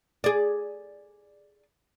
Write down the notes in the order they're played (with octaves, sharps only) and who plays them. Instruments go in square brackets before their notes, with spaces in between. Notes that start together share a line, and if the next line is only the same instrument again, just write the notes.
[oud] G#4 D5